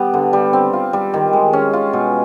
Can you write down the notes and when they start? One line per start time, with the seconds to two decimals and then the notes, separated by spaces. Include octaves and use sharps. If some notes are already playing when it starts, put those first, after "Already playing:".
Already playing: G3 B3
0.14 D3
0.33 G3
0.53 C4
0.73 F4
0.93 G3
1.14 D#3
1.33 G#3
1.53 C#4
1.73 F4
1.93 B2